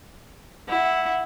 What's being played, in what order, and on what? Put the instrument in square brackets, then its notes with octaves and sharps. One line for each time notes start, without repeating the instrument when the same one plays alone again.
[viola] E4 [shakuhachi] F#5